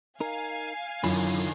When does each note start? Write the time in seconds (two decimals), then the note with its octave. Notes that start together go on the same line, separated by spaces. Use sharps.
0.20 D#4 A#4 F5 G#5
1.04 F#2 D3 D#3 E4 F4 B5